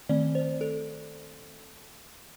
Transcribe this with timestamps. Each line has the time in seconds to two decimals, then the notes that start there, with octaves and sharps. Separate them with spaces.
0.09 D#3 A3 C4 D5
0.35 C5
0.61 A4